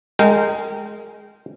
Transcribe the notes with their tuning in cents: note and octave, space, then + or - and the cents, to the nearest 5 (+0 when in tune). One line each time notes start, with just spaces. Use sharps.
G#3 +0 A#4 -25 G5 -15